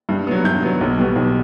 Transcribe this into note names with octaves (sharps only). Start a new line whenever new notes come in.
G2
F#3 B3
G2 G6
F#3 B3
B1
B2 G3 B3
B1